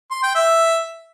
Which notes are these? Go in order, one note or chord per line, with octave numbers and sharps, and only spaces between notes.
C6
G5
E5